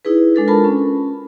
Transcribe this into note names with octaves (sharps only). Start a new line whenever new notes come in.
D#4 E4 G#4 B4
G#3 D4 A4 B4
F4 A#4 A5 B5
C#4